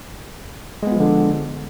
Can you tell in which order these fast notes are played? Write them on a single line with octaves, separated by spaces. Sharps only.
G#3 B3 F4 F3 D3